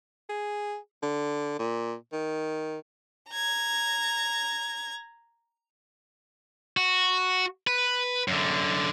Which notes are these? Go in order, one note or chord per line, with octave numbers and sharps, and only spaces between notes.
G#4
D3
A#2
D#3
A#5 G#6
F#4
B4
F#2 D3